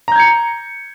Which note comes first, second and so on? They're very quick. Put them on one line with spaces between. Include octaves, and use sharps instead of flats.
A#5 G6 G#6 C#7